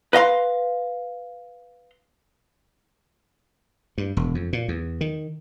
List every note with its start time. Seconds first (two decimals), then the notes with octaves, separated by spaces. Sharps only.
0.13 B4 D#5 F5 C6
3.98 G2
4.17 E1
4.35 F2
4.53 A#2
4.68 E2
5.01 D#3